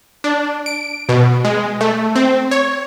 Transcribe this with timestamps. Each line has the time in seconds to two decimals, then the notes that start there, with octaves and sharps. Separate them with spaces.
0.24 D4
0.66 D7
1.09 B2
1.45 G#3
1.81 A3
2.16 C4
2.51 C#5